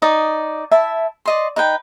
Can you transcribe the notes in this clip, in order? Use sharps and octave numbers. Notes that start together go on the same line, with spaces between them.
D#4 D5 D#6
E4 E5 A5
D5 D#5 C6
D#4 B4 G5